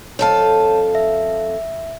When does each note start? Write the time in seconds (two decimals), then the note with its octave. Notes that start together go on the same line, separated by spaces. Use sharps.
0.19 F2 A4 C#5 F5 A5
0.95 E5